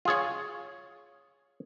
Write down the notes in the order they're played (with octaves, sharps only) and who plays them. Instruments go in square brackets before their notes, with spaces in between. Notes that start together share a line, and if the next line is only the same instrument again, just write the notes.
[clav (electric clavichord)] F4 G#4 C#5